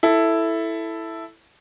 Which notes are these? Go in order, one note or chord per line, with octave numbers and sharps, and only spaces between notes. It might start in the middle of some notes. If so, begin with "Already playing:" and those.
E4 A4